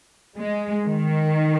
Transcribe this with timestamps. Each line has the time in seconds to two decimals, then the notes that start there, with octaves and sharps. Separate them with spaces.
0.38 G#3
0.86 D#3